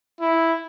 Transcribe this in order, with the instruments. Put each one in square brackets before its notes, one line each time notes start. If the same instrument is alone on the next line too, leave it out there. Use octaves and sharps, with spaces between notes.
[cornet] E4